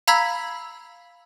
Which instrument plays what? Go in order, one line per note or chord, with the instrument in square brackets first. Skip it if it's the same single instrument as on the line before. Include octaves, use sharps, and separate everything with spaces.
[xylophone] F5 A#5 B5 E6 G#6 B6